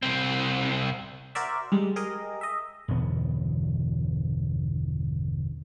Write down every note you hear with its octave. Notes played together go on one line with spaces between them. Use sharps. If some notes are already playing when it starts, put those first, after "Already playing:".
C2 C4
F#4 A#4 C5 D5 E5
G3 G#3
G4 G#4 A#4 D#5
D#5 E5
G1 E2 B2 B3